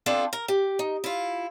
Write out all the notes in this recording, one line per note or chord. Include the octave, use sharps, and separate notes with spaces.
B3 C4 D4 E4 F4 A4
A#4
G4
D#4
E4 F4